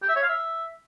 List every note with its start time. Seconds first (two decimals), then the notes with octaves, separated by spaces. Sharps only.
0.02 G4
0.09 E5
0.16 C#5
0.22 F5
0.29 E5